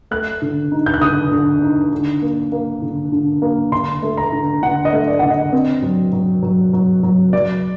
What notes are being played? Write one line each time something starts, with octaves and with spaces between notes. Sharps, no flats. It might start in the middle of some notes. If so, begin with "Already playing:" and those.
A3 F#6
D3
D#4
G6
F#6
D3 D#6
D3
D#4
D3
A#3
A#3
D3
D3
A#3
D3 C6
A3
A#5
D3
D3 F#5
D#5
A3
D5
D3 F#5
D#5
C4
F#3
F#3
F#3
F#3
F#3
F#3 D5